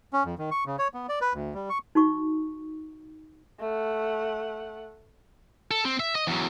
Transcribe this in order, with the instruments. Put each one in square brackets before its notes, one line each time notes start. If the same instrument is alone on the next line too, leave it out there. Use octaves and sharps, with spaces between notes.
[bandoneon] C#4
F2
D#3
C#6
C#3
C#5
B3
D5
B4
D2
G3
C#6
[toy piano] D#4 F#4 C#6
[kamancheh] A3 F#5
[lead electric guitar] A4
C4
E5
D#5
E2 F#3